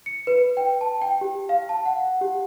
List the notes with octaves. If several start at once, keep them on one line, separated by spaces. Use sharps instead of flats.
C#7
B4
G5
A5
G5
G4
F5
A5
F#5
G4